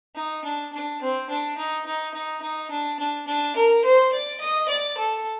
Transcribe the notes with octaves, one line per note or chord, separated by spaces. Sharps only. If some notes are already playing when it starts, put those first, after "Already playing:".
D#4
D4
D4
C4
D4
D#4
D#4
D#4
D#4
D4
D4
D4
A#4
C5
D5
D#5
D5
A4